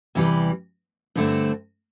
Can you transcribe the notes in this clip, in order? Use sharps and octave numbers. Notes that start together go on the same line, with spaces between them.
E2 C3 E3 G3
G2 D3 A3 C4